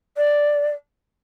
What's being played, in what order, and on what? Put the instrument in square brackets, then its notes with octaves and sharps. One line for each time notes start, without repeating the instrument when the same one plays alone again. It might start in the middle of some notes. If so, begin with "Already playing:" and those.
[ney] D5